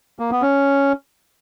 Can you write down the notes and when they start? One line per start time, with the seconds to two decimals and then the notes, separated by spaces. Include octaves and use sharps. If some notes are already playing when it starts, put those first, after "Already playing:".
0.19 A#3
0.31 B3
0.42 C#4